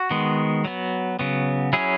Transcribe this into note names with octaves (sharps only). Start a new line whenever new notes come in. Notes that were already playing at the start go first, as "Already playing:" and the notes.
Already playing: F#4
D#3 G#3 B3
F#3 B3
C#3 F#3 B3
F#3 C#4 E4 G#4